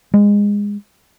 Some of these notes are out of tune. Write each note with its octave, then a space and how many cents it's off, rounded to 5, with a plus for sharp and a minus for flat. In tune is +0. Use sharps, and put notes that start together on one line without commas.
G#3 -20